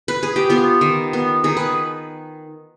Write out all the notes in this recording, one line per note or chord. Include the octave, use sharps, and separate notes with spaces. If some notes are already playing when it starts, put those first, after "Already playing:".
B4
G#4
G4
B3 F4
D#3
B3
D#3 G#4
B4